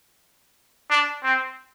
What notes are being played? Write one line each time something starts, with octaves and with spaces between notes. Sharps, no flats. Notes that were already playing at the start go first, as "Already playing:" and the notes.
D4
C4